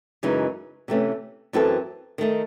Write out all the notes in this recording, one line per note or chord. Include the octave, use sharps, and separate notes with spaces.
F#2 C#3 E3 G#3 D#4
C3 E3 A3 C#4
F#2 E3 C4 F#4 A4
D#3 A3 D#4